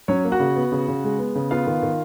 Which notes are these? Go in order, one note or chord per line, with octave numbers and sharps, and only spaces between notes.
F#3 C#4 C#5
A#3
F#4 F#5
C#3
B3
C#3
C#3
G#3
B3
C#3
B3 F4 F5
D#3
D#3